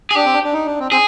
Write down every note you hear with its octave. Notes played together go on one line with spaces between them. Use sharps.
G#4
D4 G4
C4
D4
D4
D#4
D4
C4
C4 G#4